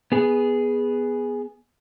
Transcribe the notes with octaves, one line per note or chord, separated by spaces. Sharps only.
B3 G#4